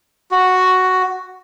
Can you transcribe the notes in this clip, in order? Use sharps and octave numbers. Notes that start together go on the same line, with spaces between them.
F#4